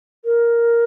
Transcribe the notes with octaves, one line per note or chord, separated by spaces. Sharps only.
A#4